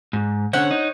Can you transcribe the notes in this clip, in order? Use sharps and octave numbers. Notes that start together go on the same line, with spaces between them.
G#2
D3 C#4 C5 C#5 F#5
D#4